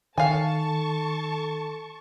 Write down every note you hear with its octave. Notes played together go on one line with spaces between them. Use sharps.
D#3 A4 F5 G#5 A5 C#6